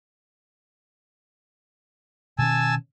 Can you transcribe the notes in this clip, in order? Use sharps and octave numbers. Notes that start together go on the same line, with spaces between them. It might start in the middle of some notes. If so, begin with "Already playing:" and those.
B2 D#3 C#4 G#5 A5 E6